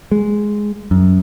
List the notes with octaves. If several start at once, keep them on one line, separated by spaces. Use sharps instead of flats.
G#3
F#2